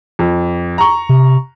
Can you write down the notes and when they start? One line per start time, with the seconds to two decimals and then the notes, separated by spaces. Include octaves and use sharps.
0.19 F2
0.78 A#5 C#6
1.09 C3